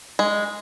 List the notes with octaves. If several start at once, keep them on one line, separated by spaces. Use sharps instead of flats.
G#3